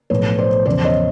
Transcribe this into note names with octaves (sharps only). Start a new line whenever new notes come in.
B1 A2 F3 B4 C#5
C5 D5
E1 E2 C#3 F3 C5 D5
C#5 D#5